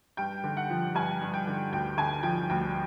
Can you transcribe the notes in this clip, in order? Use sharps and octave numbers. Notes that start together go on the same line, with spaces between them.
G2 G5
D3
F#5
F3
G2 G#5
G2
G5
D3
D2 G5
D3 G#5
F3 G5
D2 G5